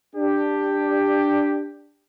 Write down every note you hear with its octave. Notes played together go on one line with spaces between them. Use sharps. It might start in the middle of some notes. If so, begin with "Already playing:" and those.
D4 G4